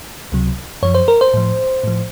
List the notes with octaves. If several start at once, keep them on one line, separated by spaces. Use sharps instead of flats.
C#2 C3 F#3
F#2 F3 C#5
C5
A#4
C5
A2 F3
A2 F3